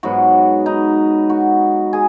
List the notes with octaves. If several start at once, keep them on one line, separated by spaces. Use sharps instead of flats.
G#2 F#3 B3 F#4
D#4
F#4
G#4